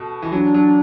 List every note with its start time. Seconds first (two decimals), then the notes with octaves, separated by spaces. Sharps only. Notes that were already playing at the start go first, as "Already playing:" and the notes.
Already playing: B2 A3
0.22 E3
0.32 F#3 D4
0.54 F#3